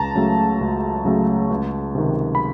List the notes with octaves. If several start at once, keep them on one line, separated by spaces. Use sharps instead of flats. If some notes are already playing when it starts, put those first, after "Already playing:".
Already playing: C#2 A5 A#5
C#3 F#3 A3
C#2
C#3 F#3 A3
C#2
C3 D#3
B5